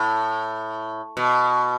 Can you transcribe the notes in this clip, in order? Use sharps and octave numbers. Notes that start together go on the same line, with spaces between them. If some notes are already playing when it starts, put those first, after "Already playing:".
Already playing: A2
B2